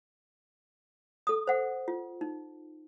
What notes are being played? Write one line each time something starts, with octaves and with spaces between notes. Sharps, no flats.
A4 D#6
C5 F#5
F4
D#4